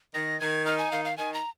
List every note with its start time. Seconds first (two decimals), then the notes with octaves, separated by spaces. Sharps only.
0.14 D#3 A#6
0.40 D#3 G#6
0.66 D#4 F6
0.78 G#5
0.92 D#3 F5
1.05 F5
1.18 D#3 G#5
1.34 A#5